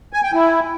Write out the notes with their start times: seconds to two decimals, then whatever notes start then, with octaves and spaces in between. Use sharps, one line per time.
0.13 G#5
0.23 G5
0.34 E4